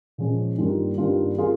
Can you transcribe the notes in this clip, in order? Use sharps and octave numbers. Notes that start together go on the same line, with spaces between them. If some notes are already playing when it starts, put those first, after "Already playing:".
A#2 F3 G#3 C#4
G2 D#3 G3 A#3 F4
G2 D#3 G3 A#3 F4
D#3 A#3 F4 G#4